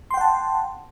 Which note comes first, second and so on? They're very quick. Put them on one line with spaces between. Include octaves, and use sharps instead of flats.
C6 G5 F#5 A5